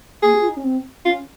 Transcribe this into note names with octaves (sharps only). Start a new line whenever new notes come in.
A#3 G#4
G4
F4
D#4
C#4
C4
C#4 F4